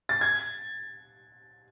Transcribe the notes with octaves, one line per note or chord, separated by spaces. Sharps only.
A6
G#6